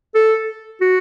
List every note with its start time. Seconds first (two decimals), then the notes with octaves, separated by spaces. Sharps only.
0.15 A4
0.81 F#4